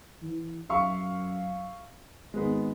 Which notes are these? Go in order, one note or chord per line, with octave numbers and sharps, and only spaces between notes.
E3
F#2 E5 F5 C#6
G#1 G#3 B3